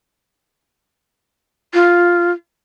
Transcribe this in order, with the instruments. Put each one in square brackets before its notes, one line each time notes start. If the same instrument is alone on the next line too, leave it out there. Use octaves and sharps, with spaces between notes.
[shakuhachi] F4